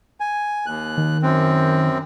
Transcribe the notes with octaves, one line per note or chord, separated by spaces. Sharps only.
G#5
D#2 F#6
D#3
F#2 C4